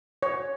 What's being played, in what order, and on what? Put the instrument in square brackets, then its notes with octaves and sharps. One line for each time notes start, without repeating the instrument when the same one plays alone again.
[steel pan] C#5